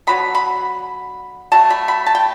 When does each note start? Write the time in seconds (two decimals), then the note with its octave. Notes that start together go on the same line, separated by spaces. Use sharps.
0.07 D3 F#3 B3 B5
0.35 B5
1.52 F#3 A3 A5
1.70 B5
1.88 B5
2.06 A5
2.15 G5